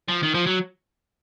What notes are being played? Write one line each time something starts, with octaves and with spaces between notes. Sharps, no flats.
F3
D#3
F3
F#3